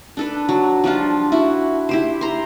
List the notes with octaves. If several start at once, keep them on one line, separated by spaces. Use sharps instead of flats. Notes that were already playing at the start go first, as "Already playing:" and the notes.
D4 A4 B4
F#3
F3 G3 D4 F4
E4 F#4
E4 G4 C5
A#5 C6